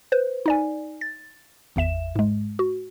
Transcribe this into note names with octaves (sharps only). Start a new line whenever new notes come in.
B4 C5
D#4 D5 G#5
A6
G#1 E2 E5 E7
G#2 G#3
F#4